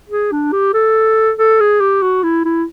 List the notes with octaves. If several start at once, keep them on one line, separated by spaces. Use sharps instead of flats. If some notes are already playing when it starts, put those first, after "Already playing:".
G#4
D4
G4
A4
A4
G#4
G4
F#4
E4
E4